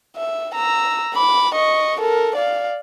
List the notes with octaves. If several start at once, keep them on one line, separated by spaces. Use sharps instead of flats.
E5
A#5 E6
B5 D6
D#5 C#6
A4 A#4
D5 F5